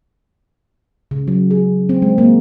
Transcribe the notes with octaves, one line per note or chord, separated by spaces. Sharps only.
C#3
F#3
G#4
C4
G#3
A#3